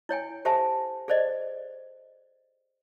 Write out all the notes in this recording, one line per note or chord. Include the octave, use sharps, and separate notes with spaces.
E4 C#5 G5 G#5
G4 A4 C5 E5 G#5 A5
G#4 A4 C5 D5 D#5